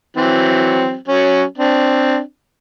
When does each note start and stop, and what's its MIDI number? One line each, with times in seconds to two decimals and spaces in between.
0.17 0.95 52
0.17 0.95 54
0.17 0.95 60
1.08 1.43 54
1.08 1.43 61
1.58 2.19 60
1.58 2.19 62